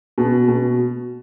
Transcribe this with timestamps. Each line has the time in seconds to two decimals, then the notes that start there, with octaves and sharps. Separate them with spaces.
0.18 B2
0.48 B2